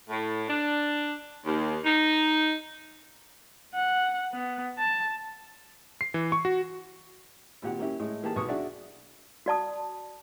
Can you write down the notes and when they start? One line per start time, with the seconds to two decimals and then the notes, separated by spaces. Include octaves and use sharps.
0.10 A2
0.49 D4
1.45 D#2
1.85 D#4
3.74 F#5
4.32 B3
4.78 A5
6.01 C7
6.14 E3
6.32 C#6
6.45 F#4
7.62 G#1 A#2 G4 F#5
7.79 A#3 C#4 E4 G4
8.00 A2 G#3
8.23 E3 A#3 G4 G#4 A5
8.36 B1 B3 C#6 D#6
8.48 D4 F#4 G#4 D5 E5
9.46 F#4 D5 A5 D#6